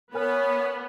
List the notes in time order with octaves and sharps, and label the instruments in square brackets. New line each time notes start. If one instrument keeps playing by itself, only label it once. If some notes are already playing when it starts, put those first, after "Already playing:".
[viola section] B3 [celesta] A#4 G#5 F6 [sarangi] B4 [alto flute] C#5